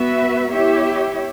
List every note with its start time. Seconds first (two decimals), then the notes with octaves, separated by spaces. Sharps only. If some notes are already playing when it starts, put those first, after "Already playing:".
Already playing: B3 F#4 B4 E5
0.51 B3 E4 G4 C#5 E5